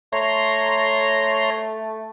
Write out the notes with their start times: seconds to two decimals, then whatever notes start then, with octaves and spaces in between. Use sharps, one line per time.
0.13 A3 C#5 A#5 C6